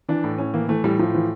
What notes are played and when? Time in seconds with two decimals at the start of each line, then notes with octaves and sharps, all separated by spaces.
0.09 E3 D4
0.24 A2
0.38 A2 C#4
0.54 E3 A#3
0.69 E3 A3
0.84 A2 G3
0.99 A2 F3
1.14 E3 F3